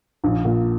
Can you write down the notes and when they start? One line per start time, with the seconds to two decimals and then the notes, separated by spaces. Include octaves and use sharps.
0.24 A#1
0.45 A#2